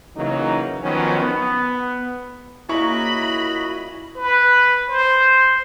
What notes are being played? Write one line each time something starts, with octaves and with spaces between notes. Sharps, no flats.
C#3 E3 F#3 A#3 D#4
D#3 F3 F#3 B3 C#4
B3
A#2 C#3 A#3 E4 F#4 D#5 B5 C#6
B4
C5